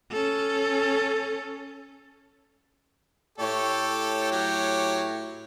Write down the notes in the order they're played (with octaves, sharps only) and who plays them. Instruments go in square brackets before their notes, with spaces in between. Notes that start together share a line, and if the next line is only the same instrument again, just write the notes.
[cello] C#4 A4
[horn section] A2 C#5 [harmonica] G4 A4
[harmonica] F#3 G4